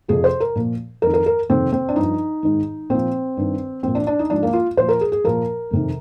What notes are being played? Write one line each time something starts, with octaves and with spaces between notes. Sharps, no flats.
F2 C3 F3 G#4
C5
A#4
A#2 F3
F2 D#3 A#4
A#4
A#4
F2 C3 D#3 C4
C4
D4
G2 F3 D#4
G#2 D#3
A#2 F3 C4
G2 D#3
A#2 F3 C4
D4
D4
D#4
G#2 F3 D4
A#3
F4
A#2 F3 C5
A#4
G#4
G#4
A#2 F3 A#4
F2 C3 D#3